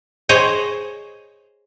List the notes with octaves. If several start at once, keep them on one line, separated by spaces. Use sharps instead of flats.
G#4 C5 C#5 D#5